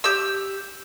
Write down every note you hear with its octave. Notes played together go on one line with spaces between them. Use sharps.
G4 E6